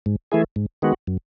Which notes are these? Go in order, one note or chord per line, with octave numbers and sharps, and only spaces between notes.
G#2
E3 A3 E4 G#4
G#2
D#3 G#3 B3 F#4
F#2